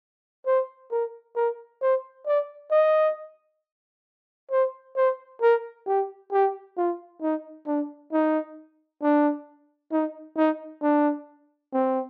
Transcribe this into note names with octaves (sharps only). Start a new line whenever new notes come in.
C5
A#4
A#4
C5
D5
D#5
C5
C5
A#4
G4
G4
F4
D#4
D4
D#4
D4
D#4
D#4
D4
C4